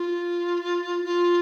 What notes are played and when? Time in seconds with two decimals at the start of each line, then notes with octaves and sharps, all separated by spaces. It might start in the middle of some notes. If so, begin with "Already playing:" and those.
Already playing: F4
1.04 F4